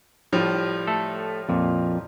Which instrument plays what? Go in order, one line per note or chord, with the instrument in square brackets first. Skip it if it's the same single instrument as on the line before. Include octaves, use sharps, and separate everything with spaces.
[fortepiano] A2 F3 G3
[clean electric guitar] A3 A4
F2 A#2